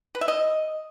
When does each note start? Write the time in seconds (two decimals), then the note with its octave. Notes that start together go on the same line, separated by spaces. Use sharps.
0.15 B4
0.21 E5
0.28 D#5